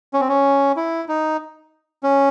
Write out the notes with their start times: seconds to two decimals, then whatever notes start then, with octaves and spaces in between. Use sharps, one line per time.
0.13 C#4
0.21 C4
0.28 C#4
0.76 E4
1.08 D#4
2.03 C#4